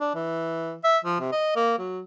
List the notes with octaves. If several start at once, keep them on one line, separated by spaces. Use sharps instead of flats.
D4
E3
E5
F3
C3
D#5
A#3
F#3